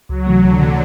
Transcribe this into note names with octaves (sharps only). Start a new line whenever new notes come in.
C#2 F#3
C3 E3 A3
C#2 D3
C3 E3 A3